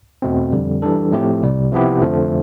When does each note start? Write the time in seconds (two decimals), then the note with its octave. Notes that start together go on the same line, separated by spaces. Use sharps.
0.22 E2 B2 A3 C4
0.52 F2 D3 G3
0.82 E3 G3 D4 A4
1.12 A2 F3 A3 C4 G4
1.42 C2 C3 G3
1.72 C3 F3 B3 E4 G4
2.01 F2 D3 F3 A3